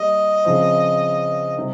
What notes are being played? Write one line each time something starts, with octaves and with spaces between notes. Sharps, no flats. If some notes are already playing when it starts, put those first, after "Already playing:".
Already playing: G3 A#3 D#5
C#3 F3 C4
C3 G3 C4